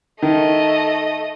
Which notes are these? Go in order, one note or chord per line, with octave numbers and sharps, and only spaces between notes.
D#3 A3 D#5